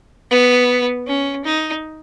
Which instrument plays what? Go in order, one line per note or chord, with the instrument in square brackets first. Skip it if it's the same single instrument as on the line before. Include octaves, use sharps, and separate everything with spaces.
[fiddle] B3
C#4
D#4